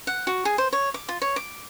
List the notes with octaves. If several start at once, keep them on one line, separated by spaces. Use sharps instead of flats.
F#5
F#4
G#4
C5
C#5
D6
F4
C#5
D6